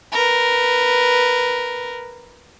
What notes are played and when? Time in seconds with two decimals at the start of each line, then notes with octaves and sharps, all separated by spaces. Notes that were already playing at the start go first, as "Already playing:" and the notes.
0.12 A#4 B4